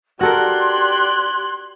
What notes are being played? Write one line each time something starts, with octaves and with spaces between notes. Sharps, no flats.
F#4 G4 A4 A#4 D5 C6 F#6 G#6